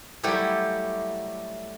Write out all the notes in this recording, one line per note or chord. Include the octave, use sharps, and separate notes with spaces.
F#3 G3 A3 E4 G4 A4